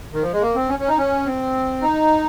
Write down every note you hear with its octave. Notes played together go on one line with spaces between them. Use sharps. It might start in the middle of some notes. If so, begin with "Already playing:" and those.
D#3
F3
G#3
A#3
C4
C#4
C#4
D#4
C#4
C4
D#4